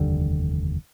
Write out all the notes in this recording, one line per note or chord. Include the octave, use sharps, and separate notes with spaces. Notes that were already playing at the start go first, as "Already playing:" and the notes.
Already playing: F1 D#2 D3 G3